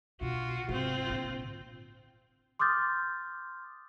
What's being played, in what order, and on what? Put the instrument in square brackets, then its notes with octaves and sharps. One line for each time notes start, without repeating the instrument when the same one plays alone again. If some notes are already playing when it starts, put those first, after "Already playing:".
[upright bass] B2 D3 [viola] F4 F#4
[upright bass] G#2 C3 [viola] C4 F4
[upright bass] A#2 D3
[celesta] C6 D6 D#6 F6 G6 A6